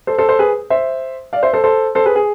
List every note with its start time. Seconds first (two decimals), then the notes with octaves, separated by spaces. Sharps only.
0.07 A4 C5
0.18 A4 C5
0.29 A4 C5
0.39 G#4 B4
0.70 C5 E5
1.33 D5 F5
1.43 C5 E5
1.54 A4 C5
1.64 A4 C5
1.95 A4 C5
2.05 G#4 B4
2.16 G#4